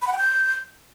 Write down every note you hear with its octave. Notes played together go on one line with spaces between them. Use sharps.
B5
F#5
G5
G6